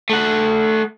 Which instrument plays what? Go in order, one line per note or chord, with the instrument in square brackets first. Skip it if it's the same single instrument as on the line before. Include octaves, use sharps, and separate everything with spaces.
[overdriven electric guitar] A3 F#5